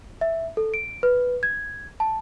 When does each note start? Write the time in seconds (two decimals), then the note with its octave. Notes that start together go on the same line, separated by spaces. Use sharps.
0.21 E5
0.57 A4
0.74 D7
1.03 B4
1.43 G#6
2.00 A5